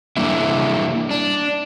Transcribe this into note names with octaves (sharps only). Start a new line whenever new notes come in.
G3 A#3 D4 E4 E5
D4